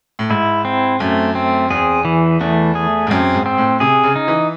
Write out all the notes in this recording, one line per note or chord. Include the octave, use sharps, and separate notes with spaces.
A2
G#2 E4
C4
F#2 A3
C4
E2 G#4
E3
E2 A3
G#4
G#2
F#2 C4
G#2
C4
A2
C3 G#4
C#3
D#4
E3